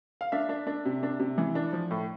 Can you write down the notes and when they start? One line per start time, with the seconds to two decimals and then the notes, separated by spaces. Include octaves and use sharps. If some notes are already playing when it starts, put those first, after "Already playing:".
0.21 F5
0.32 D4 E5
0.49 D4
0.67 D4
0.85 C3
1.03 D4
1.20 C3
1.38 E3
1.55 D4
1.73 F3
1.91 A2